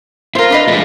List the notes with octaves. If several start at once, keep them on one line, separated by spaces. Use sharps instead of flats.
E4 F4 A#4 C5
D4 B4 D#5
F3 G#3 A3